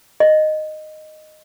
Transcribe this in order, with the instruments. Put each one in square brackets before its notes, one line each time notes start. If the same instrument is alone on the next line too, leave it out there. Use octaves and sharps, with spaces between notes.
[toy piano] D#5